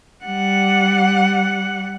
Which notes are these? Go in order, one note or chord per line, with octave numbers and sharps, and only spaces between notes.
G3 F#5